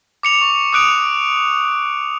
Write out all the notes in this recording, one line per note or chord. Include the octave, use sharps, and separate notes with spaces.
D6 C#7 F7
C#6 F7
D6 D#6 F#6 D7 F7